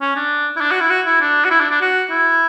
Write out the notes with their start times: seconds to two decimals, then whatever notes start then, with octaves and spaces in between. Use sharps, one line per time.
0.01 C#4
0.16 D4
0.56 E4
0.61 D4
0.71 F#4
0.80 E4
0.90 F#4
1.06 E4
1.21 D4
1.45 F#4
1.50 E4
1.60 D4
1.71 D4
1.81 F#4
2.10 E4